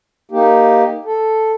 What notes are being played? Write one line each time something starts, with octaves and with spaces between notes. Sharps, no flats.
A#3 D#4 G4
A4